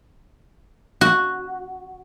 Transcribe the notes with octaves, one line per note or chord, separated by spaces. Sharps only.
F#4